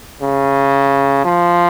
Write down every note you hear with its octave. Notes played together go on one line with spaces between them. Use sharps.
C#3
F3